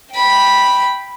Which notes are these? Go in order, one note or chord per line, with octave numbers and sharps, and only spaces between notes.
G5 B5